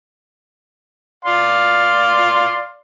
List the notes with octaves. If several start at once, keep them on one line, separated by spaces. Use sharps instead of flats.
D5 F5 C6